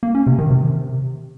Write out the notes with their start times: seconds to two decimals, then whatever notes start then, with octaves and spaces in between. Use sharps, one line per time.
0.03 A#3
0.15 C#4
0.27 C3
0.39 D#3
0.50 C3